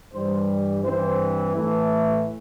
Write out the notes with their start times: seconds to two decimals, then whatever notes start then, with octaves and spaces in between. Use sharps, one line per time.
0.12 G2 E3 G3 C5
0.82 G2 E3 C4 C5
1.54 A2 E3 A3